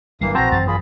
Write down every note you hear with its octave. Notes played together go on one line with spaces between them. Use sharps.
G1 G2 E3 F#3 G3 A#3 C7
A#1 E3 C4 F#4 C5 A5 A#5 A#6
G#1 F#2 E3 A6
A#2 F4 G#4 B5